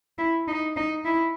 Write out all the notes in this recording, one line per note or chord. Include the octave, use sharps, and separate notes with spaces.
E4
D#4
D#4
E4